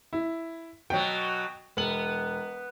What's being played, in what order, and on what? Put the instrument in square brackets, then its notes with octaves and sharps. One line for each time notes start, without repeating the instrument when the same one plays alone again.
[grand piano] E4
[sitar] B2 F#3 [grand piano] G5
[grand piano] E1 F#7 [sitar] B3